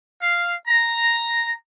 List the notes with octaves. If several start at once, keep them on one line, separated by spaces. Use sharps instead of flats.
F5
A#5